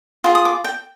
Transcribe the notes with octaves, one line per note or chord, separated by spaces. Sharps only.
F4 G#4
D#6
D6
G5